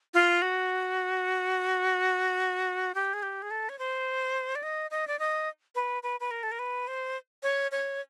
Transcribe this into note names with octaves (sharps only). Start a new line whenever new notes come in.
F4
F#4
G4
G#4
G4
G#4
A4
C#5
C5
D5
D#5
D#5
D5
D#5
B4
B4
B4
A#4
A4
A#4
B4
C5
C#5
C#5